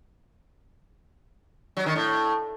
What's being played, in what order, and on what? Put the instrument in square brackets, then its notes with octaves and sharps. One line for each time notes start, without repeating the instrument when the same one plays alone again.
[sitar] F#3
D#3
A2